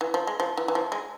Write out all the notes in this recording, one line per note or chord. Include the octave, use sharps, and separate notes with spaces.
E3
F3
G#3
F3
E3
E3
F3
G#3